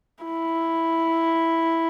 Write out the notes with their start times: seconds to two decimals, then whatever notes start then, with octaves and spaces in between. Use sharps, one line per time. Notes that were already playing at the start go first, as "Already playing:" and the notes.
0.24 E4